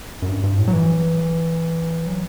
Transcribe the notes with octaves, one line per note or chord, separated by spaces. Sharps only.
F#2
G2
G2
A2
F#3
E3
F#3